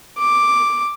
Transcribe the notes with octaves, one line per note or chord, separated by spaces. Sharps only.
D6